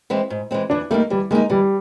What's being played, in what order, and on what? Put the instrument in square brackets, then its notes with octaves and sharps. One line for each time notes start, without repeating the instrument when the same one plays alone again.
[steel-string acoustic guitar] E3 G#3 C4
G#2
E3 G#3 C4
[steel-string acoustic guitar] E3 [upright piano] D4
[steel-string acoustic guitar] G3 A#3 D#4 [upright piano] A3
[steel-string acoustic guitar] E3 [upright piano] G3
[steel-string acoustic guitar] G3 A#3 D#4 [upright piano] G#3
[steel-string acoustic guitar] E3 [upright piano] G3